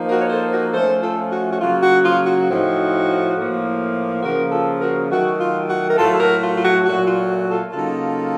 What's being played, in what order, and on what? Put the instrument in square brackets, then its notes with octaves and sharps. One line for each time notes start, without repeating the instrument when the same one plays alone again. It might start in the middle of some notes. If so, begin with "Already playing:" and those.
Already playing: [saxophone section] F3 A#3 D#4
F#4 A#4
C#5
A4 C5
F#4 A#4
F3 A3 C#4 A4 C5
F4 A4
F#4
F#4
C#3 F#3 A#3 F4
F#4
F4
F#4
A2 F3 C4 D#4
A2 F3 A#3
C#3 F3 A#3 F#4 A#4
F4 A4
F#4 A#4
D#3 F#3 A3 F#4
F4
F#4
A#4
A2 F#3 A3 F4 A4
A4
F#4 A#4
F4
F4
F#4
A#2 F#3 A3 F#4
F4
F#4
F4 A4
C#3 F#3 A#3 D#4 F4 A4